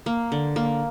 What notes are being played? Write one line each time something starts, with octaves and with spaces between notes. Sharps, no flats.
A#3
D3
A#3